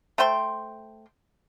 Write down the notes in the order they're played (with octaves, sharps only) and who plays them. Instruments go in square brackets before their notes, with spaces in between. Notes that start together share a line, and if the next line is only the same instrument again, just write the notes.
[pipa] A3 C5 G5 C6